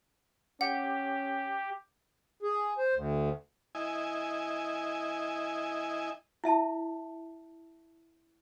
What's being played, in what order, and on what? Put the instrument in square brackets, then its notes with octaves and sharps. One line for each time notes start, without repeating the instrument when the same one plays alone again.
[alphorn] C#4 [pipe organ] G4 [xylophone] F#5
[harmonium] G#4
C5
D2
[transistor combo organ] E4 D#5 G#5
[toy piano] E4 E5 A5